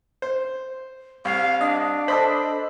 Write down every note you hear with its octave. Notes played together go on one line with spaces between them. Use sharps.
C5
C2 F5
D4 D#5
A4 C5 D#5 B5